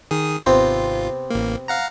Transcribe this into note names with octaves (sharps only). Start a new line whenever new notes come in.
D#3 G#4 D#6
G#1 C3 B3 C4 F4
A1 A#3
F5 F#5 A#5